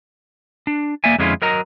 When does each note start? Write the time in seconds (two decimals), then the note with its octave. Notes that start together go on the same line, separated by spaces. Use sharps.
0.67 D4
1.04 A#3 D5 E5 G#5
1.19 F2 D3 G#3 C#4 E4 F4
1.42 F#3 A#4 D#5 A#5